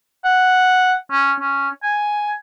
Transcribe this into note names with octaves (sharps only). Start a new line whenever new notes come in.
F#5
C#4
C#4
G#5